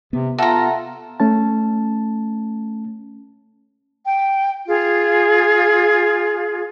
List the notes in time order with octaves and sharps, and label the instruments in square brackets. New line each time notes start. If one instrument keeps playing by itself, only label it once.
[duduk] C3 [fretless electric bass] B3
[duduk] F4 [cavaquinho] A4 A#5 [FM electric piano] E5 F#5 A#6
[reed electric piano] A3 C#4 A5
[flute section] G5
F4 G#4